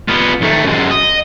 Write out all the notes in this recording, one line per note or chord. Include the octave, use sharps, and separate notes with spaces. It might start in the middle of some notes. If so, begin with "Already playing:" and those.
B3 F4
D#2 A3
F#2 G#3
D#5